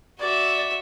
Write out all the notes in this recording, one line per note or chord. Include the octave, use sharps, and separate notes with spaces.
F#4 D5 E5